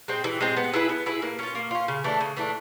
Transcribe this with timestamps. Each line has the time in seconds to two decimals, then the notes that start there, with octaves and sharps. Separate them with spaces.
0.08 G#3 C4
0.24 E3
0.41 G#3 C4
0.57 B3
0.74 E4 G#4 B4
0.89 B3
1.06 E4 G#4 B4
1.22 A#3
1.39 C#4 F4
1.55 A#3
1.71 C#4 F4
1.88 C#3
2.04 E3 A3 D4
2.21 C#3
2.37 E3 A3 D4